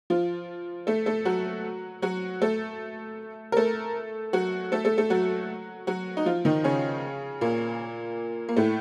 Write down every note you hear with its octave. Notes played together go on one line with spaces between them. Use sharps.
F3 F4
A3 A4
A3 A4
F#3 F#4
F#3 F#4
A3 A4
A#4
A3 A4
F#3 F#4
A3 A4
A3 A4
A3 A4
F#3 F#4
F#3 F#4
D#4
F3 F4
D#3 D#4
C#3 C#4
A#2 A#3
A#3
A2 A3